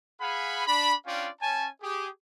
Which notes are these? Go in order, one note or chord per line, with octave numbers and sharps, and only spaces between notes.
G#4 F5 F#5 G#5 B5
D4 B5
C#4 D4 F4 D5 F5 G5
C#4 G#5 A5
G4 G#4